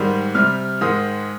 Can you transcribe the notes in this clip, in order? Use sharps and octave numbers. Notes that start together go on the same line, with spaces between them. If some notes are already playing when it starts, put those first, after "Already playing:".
Already playing: G#2 D#3 G3
C3 G3 F6
G#2 D#3 G#3 D#6